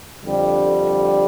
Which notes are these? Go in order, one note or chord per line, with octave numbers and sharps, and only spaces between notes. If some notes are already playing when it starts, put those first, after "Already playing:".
F2 D3 G3